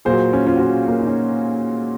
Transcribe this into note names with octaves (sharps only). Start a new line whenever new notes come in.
A#2 F#3 G#4 C5
C#4 F4
C#4 F4
F#4
C#4 F4
A#3 C#4
D#4
C#4